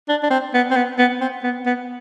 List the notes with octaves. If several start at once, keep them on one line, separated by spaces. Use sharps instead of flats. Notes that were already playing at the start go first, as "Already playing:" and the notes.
D4
D4
C4
B3
C4
B3
B3
C4
B3
B3